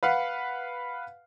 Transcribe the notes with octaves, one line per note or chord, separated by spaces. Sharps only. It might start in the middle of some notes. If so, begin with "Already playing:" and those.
B4 F5 F#5